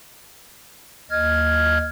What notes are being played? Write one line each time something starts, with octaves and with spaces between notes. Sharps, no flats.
D#2 D#5 F6 G#6